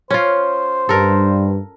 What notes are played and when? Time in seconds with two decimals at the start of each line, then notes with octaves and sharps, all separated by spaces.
0.11 C#4 F4 C5
0.89 G2 A4 A#4